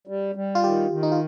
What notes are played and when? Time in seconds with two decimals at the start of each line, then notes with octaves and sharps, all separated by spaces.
0.07 G3
0.35 G3
0.55 F4
0.63 D#3 G4
0.91 D#3
1.03 D#4
1.12 F4